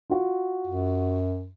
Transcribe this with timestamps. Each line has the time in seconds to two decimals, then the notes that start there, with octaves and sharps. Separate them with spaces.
0.10 F4 F#4
0.67 F#2